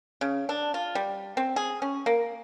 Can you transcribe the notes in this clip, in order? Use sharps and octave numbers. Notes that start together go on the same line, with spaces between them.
C#3
D4
F4
G3
C4
G#4
C#4
A#3